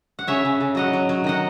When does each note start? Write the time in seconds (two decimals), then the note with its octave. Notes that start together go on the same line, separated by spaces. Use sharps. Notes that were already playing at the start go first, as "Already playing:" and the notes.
0.19 F#5
0.27 C#3 C#5 E5
0.45 C#3
0.60 C#3
0.75 F#3 D#5 F#5
0.93 F#3
1.09 F#3
1.24 D#3 D#5 F#5